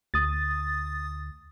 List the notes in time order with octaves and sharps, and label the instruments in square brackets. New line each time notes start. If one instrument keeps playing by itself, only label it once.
[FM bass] D2 [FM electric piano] D#6 A6